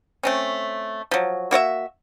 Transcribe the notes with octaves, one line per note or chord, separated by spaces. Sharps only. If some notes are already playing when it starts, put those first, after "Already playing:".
A3 C4 C#4
F3 F#3
A#3 F#4 C#5 E5